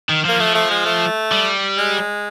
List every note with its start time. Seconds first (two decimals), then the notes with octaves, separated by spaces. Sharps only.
0.09 D#3
0.25 F3 A#3
0.39 F3 A3
0.55 A3
0.70 G#3
0.86 A3
1.32 G3
1.78 G#3